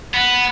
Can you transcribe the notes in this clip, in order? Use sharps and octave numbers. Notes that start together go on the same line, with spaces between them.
B3